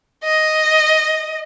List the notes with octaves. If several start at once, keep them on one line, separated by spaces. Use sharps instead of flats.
D#5